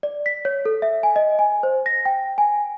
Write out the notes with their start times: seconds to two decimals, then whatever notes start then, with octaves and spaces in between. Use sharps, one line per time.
0.03 D5
0.26 B6
0.45 C#5
0.65 A4
0.82 E5
1.03 G#5
1.16 D#5
1.39 G#5
1.63 C5
1.86 A#6
2.05 G5
2.38 G#5